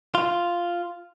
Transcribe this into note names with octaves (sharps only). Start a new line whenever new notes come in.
F4